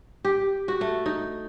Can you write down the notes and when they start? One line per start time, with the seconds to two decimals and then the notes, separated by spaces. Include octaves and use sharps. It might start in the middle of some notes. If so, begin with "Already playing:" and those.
0.25 G4
0.68 F#4
0.81 A3
1.06 D#4